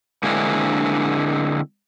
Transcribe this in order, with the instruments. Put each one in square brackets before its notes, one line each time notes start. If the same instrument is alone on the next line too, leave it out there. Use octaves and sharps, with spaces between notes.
[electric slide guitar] D3 G#3 A#3 C4 D4 E4